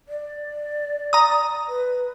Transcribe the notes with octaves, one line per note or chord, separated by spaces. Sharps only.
D5
A#5 D#6
B4